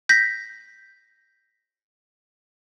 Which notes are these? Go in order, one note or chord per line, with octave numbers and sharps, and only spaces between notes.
G6 A#6 B6